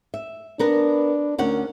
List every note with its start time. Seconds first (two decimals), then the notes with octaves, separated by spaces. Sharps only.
0.14 E5
0.59 B3 D4 A#4 B4
1.38 D2 C#4 A#4 F#5